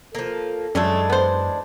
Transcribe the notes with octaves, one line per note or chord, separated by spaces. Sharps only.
F3 A#3 A4
F#2 E3 G#3 A3 C#4 D4
B3 C5